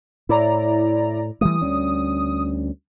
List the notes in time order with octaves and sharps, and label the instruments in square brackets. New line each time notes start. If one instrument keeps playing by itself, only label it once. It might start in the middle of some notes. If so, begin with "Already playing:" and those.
[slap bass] A2 [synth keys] E4 D5 A#5
[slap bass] E3 G3 A3 [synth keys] D#6
[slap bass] D2 G3 C#4